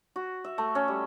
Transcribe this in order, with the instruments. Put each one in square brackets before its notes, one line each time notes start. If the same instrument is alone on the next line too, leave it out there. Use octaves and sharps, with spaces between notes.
[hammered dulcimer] F#4
E5
A3
C#4
G3